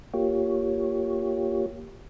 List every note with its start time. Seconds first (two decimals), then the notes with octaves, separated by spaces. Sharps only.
0.14 A#3 F4 G4 C#5